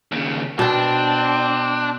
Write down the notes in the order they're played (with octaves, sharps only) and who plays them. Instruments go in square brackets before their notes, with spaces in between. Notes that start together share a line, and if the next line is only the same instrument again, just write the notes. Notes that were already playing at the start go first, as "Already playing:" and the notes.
[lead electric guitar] D#2 C#3
[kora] B2 G5 [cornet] C4 [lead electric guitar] D4